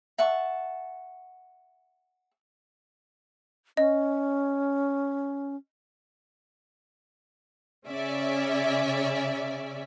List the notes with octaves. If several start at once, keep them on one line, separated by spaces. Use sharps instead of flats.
E5 F#5 A5 C#6
C#4 D#5
C#3 C#4 D5 E5